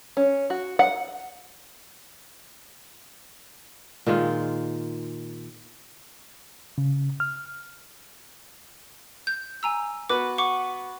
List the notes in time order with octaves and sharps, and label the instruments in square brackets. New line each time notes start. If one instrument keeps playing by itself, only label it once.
[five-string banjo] C#4
F#4
F#5
[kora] A#2 D#3 G#3 F4
[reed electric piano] C#3
F6
[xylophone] G6
G#5 A#5 E6
[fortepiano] B3 F#4 B4 [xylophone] D6
[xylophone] F#5 C#6 D6